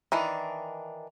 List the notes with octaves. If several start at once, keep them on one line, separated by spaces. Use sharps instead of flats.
D#3 E3 D4